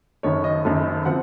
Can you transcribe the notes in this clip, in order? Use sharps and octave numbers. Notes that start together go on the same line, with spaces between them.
F#1 F#2 D#3 C#5
D#5
F#1 F#2 D#3
F3 C4 F#5